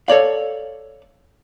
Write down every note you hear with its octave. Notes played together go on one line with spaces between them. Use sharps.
A4 C#5 D5 F5